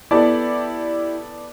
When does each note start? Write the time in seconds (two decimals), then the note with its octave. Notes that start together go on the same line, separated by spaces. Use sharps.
0.11 B3 E4 G4 A4 D5 A5